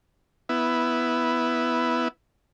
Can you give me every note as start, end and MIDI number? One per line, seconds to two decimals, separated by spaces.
0.49 2.08 59
0.49 2.08 64